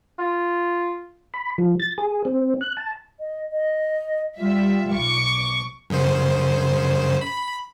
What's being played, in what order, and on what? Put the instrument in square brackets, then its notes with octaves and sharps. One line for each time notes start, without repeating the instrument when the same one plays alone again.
[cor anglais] F4
[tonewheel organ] B5
F3
A6
G#4
C4
F#6
A5
[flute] D#5
D#5
[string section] G3 E5 [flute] F4
[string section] B1 C#6 D6
[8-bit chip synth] F#2 C#3 C5
B5